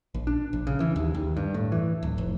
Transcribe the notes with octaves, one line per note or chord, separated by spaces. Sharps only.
A#1
D4
A#1
C#3
E3
D#2
D#2
G2
A2
E3
D1
F1